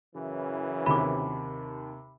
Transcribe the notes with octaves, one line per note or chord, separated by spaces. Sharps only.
F#2 C#3 E3
D#2 C3 B5 D6